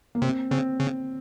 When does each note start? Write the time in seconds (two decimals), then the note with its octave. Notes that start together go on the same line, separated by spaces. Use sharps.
0.15 A#3
0.22 C3 C4
0.51 C#3 C4
0.80 C#3